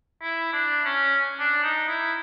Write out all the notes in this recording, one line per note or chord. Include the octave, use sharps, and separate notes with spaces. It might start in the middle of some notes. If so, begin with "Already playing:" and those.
E4
D4
C#4
D4
D#4
E4